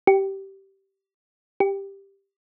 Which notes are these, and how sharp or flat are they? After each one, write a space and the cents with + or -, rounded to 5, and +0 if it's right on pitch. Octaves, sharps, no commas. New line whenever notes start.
G4 -15
G4 +5